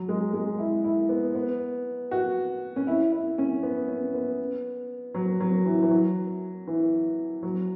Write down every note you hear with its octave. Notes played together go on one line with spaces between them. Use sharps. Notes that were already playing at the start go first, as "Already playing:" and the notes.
Already playing: F#3
G#3
G#3
E4
E4
B3
B3
F#4
C#4
E4
E4
C#4
B3
C#4
B3
F#3
F#3
E3
E3
F#3
E3
F#3